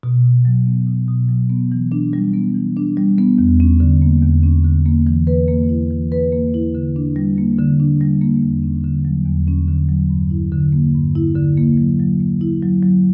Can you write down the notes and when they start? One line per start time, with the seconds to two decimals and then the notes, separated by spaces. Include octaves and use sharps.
0.03 B2
0.25 B2
0.45 F#3
0.66 B3
0.87 B2
1.08 B2
1.29 F#3
1.50 B3
1.72 E3
1.92 D4
2.13 G3
2.33 B3
2.55 E3
2.77 D4
2.97 G3
3.18 B3
3.38 E2
3.60 C#4
3.80 D3
4.02 A#3
4.23 E2
4.43 C#4
4.64 D3
4.86 A#3
5.07 E3
5.27 B4
5.48 A#3
5.69 E4
5.90 E3
6.12 B4
6.32 A#3
6.54 E4
6.75 D3
6.96 D4
7.16 G3
7.38 A#3
7.58 D3
7.80 D4
8.01 G3
8.22 A#3
8.43 E2
8.63 C#4
8.84 D3
9.05 F#3
9.26 E2
9.48 C#4
9.68 D3
9.89 F#3
10.10 G2
10.31 E4
10.52 D3
10.73 A#3
10.94 G2
11.15 E4
11.36 D3
11.57 A#3
11.78 F#3
12.00 F#3
12.21 A#3
12.41 E4
12.62 F#3
12.83 F#3